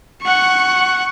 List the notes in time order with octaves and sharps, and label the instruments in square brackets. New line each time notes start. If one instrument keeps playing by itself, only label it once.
[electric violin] F#5 C#6